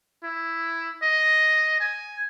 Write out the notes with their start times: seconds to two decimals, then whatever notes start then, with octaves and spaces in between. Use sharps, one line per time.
0.24 E4
1.03 D#5
1.80 G#5